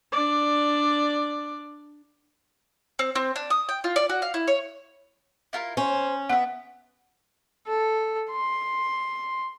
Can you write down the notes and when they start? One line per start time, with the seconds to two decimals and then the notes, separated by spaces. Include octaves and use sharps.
0.12 D4 D5
2.99 C4
3.15 C4
3.36 D4
3.50 D#6
3.69 G5
3.84 F4
3.96 D5
4.09 F#4
4.22 F5
4.34 E4
4.47 C#5
5.53 E4 F4 A#4
5.77 C#4 C5
6.29 B3 E5 F#5
7.67 A4
8.31 C6